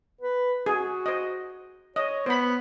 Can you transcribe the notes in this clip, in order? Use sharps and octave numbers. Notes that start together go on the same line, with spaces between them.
B4
F#4 G#4
C5 D#5
C#5 D#5
B3 C5 B5